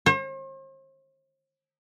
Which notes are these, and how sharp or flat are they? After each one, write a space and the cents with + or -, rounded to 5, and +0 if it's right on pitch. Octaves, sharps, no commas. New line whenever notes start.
C5 +45